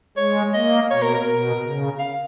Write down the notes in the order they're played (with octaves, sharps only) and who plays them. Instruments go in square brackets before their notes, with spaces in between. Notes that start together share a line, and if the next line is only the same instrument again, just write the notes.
[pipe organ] G#3 [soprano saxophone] C#5
[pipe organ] A#3 [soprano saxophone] D#5
[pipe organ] B2 [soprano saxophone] C#5
[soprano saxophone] A#4
A#4
[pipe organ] B2
C#3
[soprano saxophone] F5